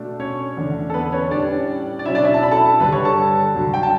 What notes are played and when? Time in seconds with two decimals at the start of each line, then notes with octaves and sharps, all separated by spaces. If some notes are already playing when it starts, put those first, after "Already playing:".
Already playing: B2 A3 D4
0.20 C#4 C#5
0.57 E2 D3 A3 D4
0.90 A4
0.94 B3 B4
1.12 C#4 C#5
1.31 A2 G3 C#4 D4 D5
1.99 D5
2.06 B2 F#3 C#4 E4 E5
2.15 D4 D5
2.24 E4 E5
2.34 A5
2.43 B5
2.51 A4 A5
2.80 G2 D3 G3 B4 B5
2.92 C#5 C#6
3.05 A4 A5
3.55 G2 D3 F#3
3.74 G5
3.83 A5